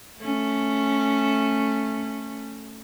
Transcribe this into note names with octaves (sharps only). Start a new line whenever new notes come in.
A3 C#4